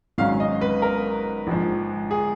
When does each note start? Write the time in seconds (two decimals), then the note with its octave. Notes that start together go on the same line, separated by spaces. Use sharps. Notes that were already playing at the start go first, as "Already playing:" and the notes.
0.18 G#1 G#2 F#3 C#4 F5
0.40 D#5
0.61 B4
0.82 A#4
1.47 A#1 G#2 F3
2.11 G#4